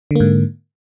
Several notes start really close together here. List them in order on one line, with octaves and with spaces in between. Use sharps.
D3 A#3 G#2